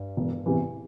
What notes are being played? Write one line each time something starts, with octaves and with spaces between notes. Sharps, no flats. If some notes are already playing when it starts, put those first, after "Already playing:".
Already playing: G2
E1
E2 C3 E3